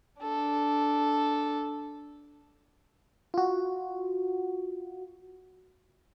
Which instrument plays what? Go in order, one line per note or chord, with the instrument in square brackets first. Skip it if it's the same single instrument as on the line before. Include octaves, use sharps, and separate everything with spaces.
[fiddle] D4 A4
[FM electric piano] F4 F#4